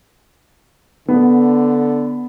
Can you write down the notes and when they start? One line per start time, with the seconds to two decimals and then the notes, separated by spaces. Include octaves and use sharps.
1.08 D3 B3